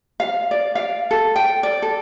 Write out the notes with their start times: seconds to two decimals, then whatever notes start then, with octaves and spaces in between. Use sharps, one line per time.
0.20 F5
0.51 D5
0.75 F5
1.11 A4
1.36 G5
1.63 D5
1.82 A4